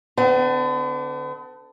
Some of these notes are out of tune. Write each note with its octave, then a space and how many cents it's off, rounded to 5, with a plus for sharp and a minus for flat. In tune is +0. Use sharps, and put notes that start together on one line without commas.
D3 +0 B3 +45